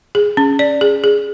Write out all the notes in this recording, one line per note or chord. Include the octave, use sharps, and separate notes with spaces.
G#4
C#4
D5
G#4
G#4